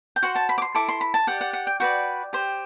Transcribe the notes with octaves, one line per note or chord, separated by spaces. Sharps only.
G5
F#4 C5 F#5
A5
B5
D6
C6
E4 A4 D6
C6
B5
A5
G4 D5 F#5
F#5
F#5
G5
F#4 B4 D5 G5
G4 C5